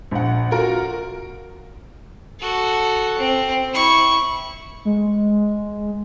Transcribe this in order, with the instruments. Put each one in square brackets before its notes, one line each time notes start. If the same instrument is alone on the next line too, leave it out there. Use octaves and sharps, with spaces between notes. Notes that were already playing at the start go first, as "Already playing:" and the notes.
[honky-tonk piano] A#1 F#5
F4 F#4 A#4
[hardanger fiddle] F#4 A4
C4
E4 C#6
[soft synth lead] G#3